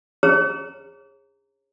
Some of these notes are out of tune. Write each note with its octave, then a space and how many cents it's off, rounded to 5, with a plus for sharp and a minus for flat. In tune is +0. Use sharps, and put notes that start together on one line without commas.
G#4 -30 C#5 -35 A#5 -15